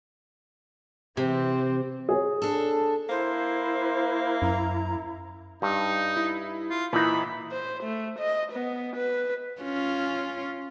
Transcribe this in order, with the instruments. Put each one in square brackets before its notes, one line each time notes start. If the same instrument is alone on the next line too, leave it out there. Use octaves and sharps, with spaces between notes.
[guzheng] C3 [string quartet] E3 C4
[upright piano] G#4 C#5
[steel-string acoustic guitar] D4 A4
[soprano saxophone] A#3 [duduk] E4 [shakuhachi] C5
[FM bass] F#2 [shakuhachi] A#5
[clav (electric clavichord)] G2 [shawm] D#4
[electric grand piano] E4
[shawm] F4
[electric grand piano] A#2 E4 [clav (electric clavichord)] E3 D#4 [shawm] B5
[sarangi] C5
A3
D#5
B3
B4
[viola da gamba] C#4 F4